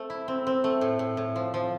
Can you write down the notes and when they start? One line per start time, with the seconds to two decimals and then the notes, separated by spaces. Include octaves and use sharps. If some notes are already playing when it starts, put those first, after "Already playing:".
Already playing: A3 C4
0.10 E4
0.28 C4
0.47 C4
0.64 A3
0.81 A2
0.99 A2
1.17 A2
1.36 F3
1.54 F3